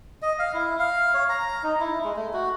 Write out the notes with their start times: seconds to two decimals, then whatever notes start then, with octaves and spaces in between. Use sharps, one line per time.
0.22 D#5
0.39 F5
0.54 E4
0.79 F5
1.14 C#5
1.29 A#5
1.63 D#4
1.80 E4
2.04 G#3
2.16 A3
2.33 F#4